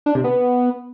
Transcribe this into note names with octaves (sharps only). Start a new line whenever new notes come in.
D4
C3
B3